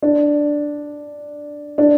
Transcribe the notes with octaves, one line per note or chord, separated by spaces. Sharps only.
D4
D4